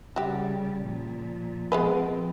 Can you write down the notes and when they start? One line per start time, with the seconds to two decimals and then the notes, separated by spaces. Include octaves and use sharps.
0.16 C#3 G3 F#4 G4
0.83 A#2 F3
1.72 F3 G#3 B3 C4 B4